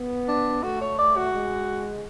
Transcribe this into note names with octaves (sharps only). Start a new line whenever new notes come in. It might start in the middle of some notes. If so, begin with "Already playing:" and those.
Already playing: B3
D4
A3 F#4
C#5
D5
F#4
G#3